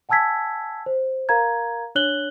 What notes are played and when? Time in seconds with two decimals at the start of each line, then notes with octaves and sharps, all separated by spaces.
0.09 F#5 G#5 A5 E6 G#6 B6
0.86 C5
1.29 A#4 F5 A#5 G#6
1.95 D4 C#5 F#6 F#7 G7